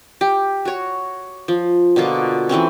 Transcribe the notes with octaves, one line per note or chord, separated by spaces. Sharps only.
G4
F#4 C#5
F3
B2 D3 A#3 F4
E3 A3 C4 C#4